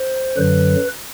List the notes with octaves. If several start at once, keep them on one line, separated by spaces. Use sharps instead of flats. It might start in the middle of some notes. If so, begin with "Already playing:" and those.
Already playing: C5
F#2 D3 F#3 B4